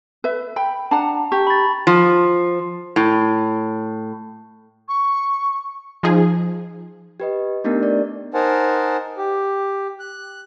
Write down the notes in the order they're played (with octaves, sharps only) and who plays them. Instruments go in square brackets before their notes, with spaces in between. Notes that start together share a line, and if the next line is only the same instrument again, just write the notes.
[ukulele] B4 E5
G5 B5
[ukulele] D4 F#5 [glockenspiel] A5 A#5
[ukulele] G4 [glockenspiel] C#6
[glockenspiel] B5 A6
[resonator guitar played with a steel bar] F3
A2
[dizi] C#6
[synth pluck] F3 D#4 G#4
[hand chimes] G4 B4 D#5
A3 B3 D4 D#4 G4 A#4
D5
[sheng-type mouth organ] D#4 A#4 C5 F#5 G#5 A5
G4
F#6